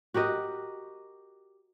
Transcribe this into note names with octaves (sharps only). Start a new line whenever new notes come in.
F#4 G4 A#4 D#5